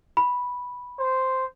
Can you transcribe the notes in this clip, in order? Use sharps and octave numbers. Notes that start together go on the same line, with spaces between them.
B5
C5